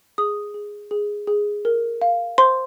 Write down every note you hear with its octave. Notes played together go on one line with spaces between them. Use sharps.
G#4 D#6
G#4
G#4
G#4
A#4
F5
C5 C6